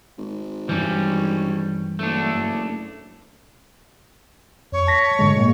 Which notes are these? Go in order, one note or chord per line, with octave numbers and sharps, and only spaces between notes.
G#1
G2 E3 G3 C#4
F#1 A3 D4
F2 C#5
A5 A#6 B6
G#2 D3 G#3
A#2 G#3 A#3